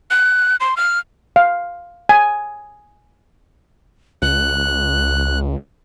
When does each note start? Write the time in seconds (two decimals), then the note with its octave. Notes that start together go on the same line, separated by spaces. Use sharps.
0.10 F#6
0.60 C6
0.77 F6
1.36 F5
2.09 G#5
4.22 C#2 F#6